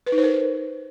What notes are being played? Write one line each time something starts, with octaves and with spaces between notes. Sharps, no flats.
B4
D#4
C5
A#4